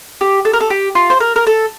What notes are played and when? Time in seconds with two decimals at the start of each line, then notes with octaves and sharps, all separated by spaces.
0.21 G4
0.45 A4
0.53 A#4
0.60 A4
0.70 G4
0.95 F4
1.10 C5
1.20 A#4
1.36 A#4
1.47 A4